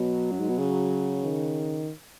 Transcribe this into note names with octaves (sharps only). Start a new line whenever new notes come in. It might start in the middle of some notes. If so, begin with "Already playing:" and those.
Already playing: B2 F#3
F#2
G#2
B2
C#3
D#3